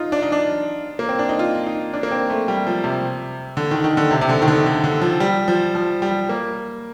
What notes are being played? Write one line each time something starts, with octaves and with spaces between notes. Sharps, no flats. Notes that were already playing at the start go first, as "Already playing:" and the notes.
Already playing: D#4 F4
D4
D#4
D4
A#3
C4
D4
D#4
F4
D#4
D4
A#3
C4
A3
G3
F3
C3
D3
D#3
D#3
D3
C3
C3
D3
D#3
D3
D3
D3
F3
G3
F3
F3
G3
A#3